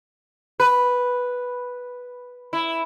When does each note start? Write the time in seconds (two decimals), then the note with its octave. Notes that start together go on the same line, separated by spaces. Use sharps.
0.60 B4
2.53 E4